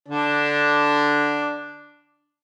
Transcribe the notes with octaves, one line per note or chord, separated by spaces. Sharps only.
D3 D4